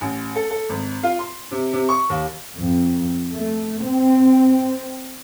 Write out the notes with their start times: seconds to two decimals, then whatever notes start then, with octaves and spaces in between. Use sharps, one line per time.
0.01 A1
0.36 A4
0.51 A4
0.69 G#1
1.03 F4
1.19 C6
1.51 C3
1.73 C3
1.89 C#6
2.10 D#2
2.57 F2
3.35 A3
3.83 C4